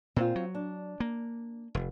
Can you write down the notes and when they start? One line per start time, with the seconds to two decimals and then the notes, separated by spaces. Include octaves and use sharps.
0.16 A#2 C4 F4
0.36 F#3
0.55 D4
1.00 A#3
1.75 F1